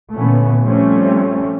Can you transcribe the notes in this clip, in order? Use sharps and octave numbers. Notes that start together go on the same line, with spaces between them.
A#2 D3 E3 A3 B3 C#4
F3 G3 A3 C4 C#4